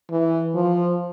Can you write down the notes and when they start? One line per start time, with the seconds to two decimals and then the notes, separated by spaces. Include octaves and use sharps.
0.11 E3
0.55 F3